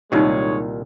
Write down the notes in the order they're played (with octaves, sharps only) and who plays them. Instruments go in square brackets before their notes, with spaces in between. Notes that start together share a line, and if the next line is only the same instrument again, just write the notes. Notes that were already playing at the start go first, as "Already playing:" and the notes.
[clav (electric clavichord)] C2 A#2 D#3 [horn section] G#3 C#5 [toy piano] D#4 F4 G4